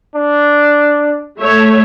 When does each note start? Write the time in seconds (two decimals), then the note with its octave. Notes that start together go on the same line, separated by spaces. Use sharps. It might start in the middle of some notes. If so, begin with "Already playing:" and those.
0.15 D4
1.39 A3 C#5 E5